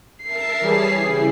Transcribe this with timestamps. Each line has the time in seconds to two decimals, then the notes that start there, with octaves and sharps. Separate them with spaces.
0.23 A#4 E5 A5 C7
0.61 E3 G3 G#4 C#5 A5 B6
0.95 C#3 E4